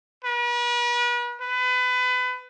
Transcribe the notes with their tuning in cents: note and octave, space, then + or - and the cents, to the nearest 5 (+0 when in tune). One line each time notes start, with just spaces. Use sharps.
B4 -40
B4 +25